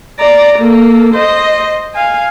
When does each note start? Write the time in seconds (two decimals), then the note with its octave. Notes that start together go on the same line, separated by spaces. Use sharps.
0.19 D5 A#5
0.58 A#3 A4
1.15 C5 D#5
1.95 F5 G#5